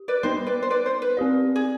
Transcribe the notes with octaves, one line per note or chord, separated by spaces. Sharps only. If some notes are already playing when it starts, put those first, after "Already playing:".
Already playing: G4
B4 D5
G3 B3 D#4 C5 D#5
B4 D5
C5
B4 D5
C5
B4
C4 G4 D5
G#4